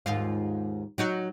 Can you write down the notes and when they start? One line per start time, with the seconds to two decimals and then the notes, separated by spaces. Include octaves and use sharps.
0.06 D#2 G#2 F4
0.98 F#3 D#4 F#4